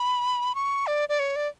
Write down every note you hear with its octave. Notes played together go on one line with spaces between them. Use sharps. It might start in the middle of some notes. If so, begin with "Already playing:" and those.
Already playing: B5
C#6
D5
D5
C#5
D5